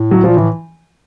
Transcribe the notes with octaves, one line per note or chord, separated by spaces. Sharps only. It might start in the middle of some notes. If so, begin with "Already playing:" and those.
Already playing: A2
F#3
F3
A#2
A2 E3